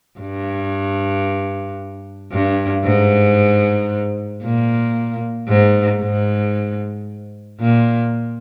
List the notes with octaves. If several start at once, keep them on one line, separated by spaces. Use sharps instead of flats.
G2
G2
G#2
A#2
G#2
G#2
A#2